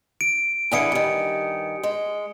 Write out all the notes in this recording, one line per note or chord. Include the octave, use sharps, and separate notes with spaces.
D7
E2 D3 E3 G#5 D#6 C#7
G2 D#3
G#3